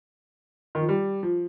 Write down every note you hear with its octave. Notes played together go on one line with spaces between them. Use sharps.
D#3
F3
G3
F3